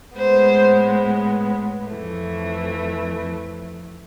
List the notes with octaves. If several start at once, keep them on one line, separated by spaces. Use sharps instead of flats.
A2 G#3 B3 C5
F2 E3 A3